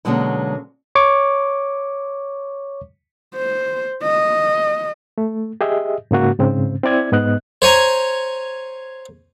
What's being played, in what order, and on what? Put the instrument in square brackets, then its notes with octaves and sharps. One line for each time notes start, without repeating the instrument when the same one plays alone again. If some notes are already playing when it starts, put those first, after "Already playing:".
[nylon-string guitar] B2 D3 F#3 G#3 A#3 C#4
[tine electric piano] C#5 C#6 D6
[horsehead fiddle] C5
D#5
[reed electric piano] A3
G4 G#4 D#5 E5
G#2 C#3 A#3 F#4
G#2 C#3 C4
C4 E4 D5 G#6
G#2 B3 D#5 F#6
[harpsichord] C5 C#5 G#5 A#5